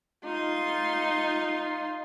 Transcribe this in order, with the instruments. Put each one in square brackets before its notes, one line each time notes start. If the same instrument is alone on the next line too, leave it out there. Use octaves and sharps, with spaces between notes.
[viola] D#4 C6 [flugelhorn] F4